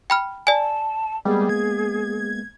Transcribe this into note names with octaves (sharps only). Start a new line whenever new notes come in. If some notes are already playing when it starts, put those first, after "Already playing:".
G5 B5 F6
D5 G#5 A5
G3 G#3 A#3 B3 G#4
G#6